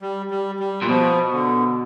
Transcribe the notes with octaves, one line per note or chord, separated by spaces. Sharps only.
G3
G3
G3
A#2
B2 F3
D3